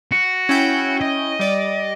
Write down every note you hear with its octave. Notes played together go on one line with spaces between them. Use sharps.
F#4
C#4 E4 G5
D#5
G3 D5